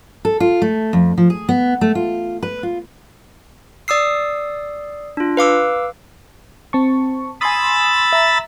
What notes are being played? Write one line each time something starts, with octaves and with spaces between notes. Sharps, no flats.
A4
F4
A3
F2
F3
G#4
B3
A3
F4
B4
F4
D5 D#6 E6 C7
D4 F4
B4 F5 D6 E6
C4 A5 C#6
G#5 B5 C6 D#6 E6 A6
E5 A#5